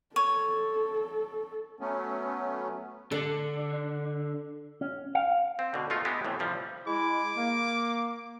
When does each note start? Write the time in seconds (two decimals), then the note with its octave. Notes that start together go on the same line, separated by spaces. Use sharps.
0.16 A4 C#5
1.80 F#3 A3 B3 C#4
3.12 D3 D4 A4
4.81 C#4
5.15 F5
5.59 C4
5.74 B2 D3
5.90 G#3 A3 F4
6.05 G#3 B3 G4 E5
6.25 A2 C3 E3
6.39 C3 F3 G3
6.87 G#3 E4 D6
7.36 A#3